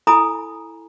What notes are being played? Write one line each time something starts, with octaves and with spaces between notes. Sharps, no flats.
E4 A4 G#5 A#5 B5 D#6